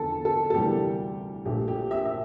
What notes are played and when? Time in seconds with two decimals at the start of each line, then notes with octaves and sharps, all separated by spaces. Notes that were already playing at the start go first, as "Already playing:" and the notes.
Already playing: E2 D3 F3 A4
0.25 A4
0.50 A4
0.54 D2 C3 E3 G3 A#3 G4
1.45 A#1 A#2 A3 G4
1.68 G4
1.91 E5
2.06 E5